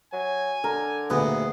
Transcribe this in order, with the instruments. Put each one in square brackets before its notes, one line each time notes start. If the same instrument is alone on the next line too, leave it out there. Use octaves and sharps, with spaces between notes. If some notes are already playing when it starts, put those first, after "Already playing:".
[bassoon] F#3 [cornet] G#5
[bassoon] D3 [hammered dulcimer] A#4
[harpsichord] D2 A#2 [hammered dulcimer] B3 G#4